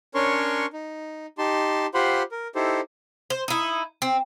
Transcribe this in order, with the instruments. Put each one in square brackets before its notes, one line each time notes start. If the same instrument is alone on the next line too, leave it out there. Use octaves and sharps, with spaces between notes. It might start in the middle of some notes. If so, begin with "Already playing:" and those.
[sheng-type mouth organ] C#4 D4 A#4 C#5 C6 C#6
D#4
D#4 G4 A5 C6
F4 G4 C5 F#5 B5 C6
A#4
D#4 E4 G4 A4 C5
[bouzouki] C5
D#4 E4
C4